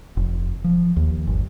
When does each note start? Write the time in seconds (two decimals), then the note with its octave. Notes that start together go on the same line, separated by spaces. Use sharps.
0.17 F1
0.64 F3
0.96 D#2
1.27 G1